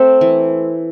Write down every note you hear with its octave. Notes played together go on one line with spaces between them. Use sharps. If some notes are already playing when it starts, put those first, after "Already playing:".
Already playing: A3 C4
E3